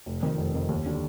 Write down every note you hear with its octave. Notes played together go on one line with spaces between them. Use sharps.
F1
F2 D#3
F1
F2 D#3
D#2
D3 G3